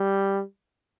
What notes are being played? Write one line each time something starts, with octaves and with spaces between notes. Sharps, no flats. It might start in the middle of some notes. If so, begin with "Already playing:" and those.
Already playing: G3